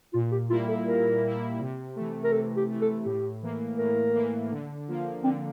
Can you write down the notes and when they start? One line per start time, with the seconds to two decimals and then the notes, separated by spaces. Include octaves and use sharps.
0.13 A#2 F4
0.32 G4
0.50 G3 A#3 E4 F4
0.68 A4
0.87 A#2 A#4
1.24 G3 A#3 E4
1.60 C3
1.96 E3 A3
2.24 A#4
2.32 C3 A4
2.57 G4
2.69 E3 A3
2.81 A4
3.05 A2 G4
3.42 E3 A#3
3.78 A2 A#4
4.14 E3 A#3
4.51 D3
4.88 F3 A#3
5.24 D3 C4